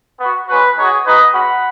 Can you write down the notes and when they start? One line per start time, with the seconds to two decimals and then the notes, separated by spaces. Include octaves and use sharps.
0.20 B3 F#4
0.48 G#3 C#4 F#4 B4
0.76 G#3 D#4 F#4 G#4 C#5
1.04 G#3 D#4 F#4 B4 D#5
1.33 G#3 C#4 F#4 F#5 B5